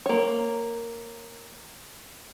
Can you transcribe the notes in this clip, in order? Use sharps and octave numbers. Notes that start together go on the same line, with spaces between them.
A#3 C#5